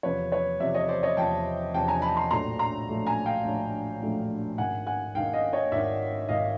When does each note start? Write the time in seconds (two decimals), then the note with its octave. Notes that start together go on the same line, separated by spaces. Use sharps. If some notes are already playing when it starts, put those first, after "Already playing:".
0.03 E2 C3 F3 B4 C#5
0.32 B4 C#5
0.60 E2 C3 F3 D5 E5
0.74 C#5 D#5
0.89 C5 D5
1.03 C#5 D#5
1.17 E2 C3 F3 G5 A5
1.74 E2 C3 F3 G5 A5
1.88 G#5 A#5
2.02 A5 B5
2.17 A#5 C6
2.31 A#1 A2 F#3 A3 D4 A#5 C6
2.59 A#5 C6
2.88 A#1 A2 F#3 A3 D4
3.06 G#5 A#5
3.26 F5 G5
3.44 A#1 A2 F#3 A3 D4
4.01 A#1 A2 F#3 A3 D4
4.58 G#1 G#2 D#3 F#5 G#5
4.87 F#5 G#5
5.15 G#1 G#2 D#3 F5 G5
5.33 D#5 F5
5.53 C#5 D#5
5.72 G#1 G#2 D#3 D5 E5
6.29 G#1 G#2 D#3 D#5 F5